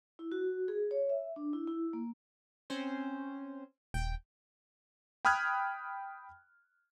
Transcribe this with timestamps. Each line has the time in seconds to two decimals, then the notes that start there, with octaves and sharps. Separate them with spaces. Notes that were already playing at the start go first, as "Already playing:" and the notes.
0.19 E4
0.32 F#4
0.68 G#4
0.91 C#5
1.09 E5
1.36 D4
1.53 E4
1.67 E4
1.93 A#3
2.70 C4 C#4 C5
3.94 D#1 G5
5.25 G5 B5 D#6 F6 F#6 G#6